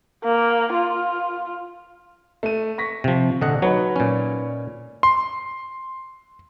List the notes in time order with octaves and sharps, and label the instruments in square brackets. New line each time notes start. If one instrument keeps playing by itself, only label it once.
[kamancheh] A#3
F4
[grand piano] A3 D#7
C#6 A#6 B6
[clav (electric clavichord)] C3 F3
[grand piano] A#1 [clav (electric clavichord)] D3 D#5 F#5
[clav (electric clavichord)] F#3 [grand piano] D#4 B4 C#5
[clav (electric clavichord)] A#2 C#4
[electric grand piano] C6